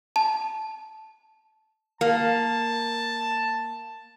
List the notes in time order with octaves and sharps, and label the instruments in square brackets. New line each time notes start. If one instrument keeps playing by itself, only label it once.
[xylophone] A5
[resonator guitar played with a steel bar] A#3 [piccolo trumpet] A5